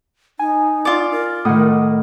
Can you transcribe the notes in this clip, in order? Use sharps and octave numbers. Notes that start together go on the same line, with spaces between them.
D#4 G#5
F4 D5
A#4
A2 D#3 F#5 D#6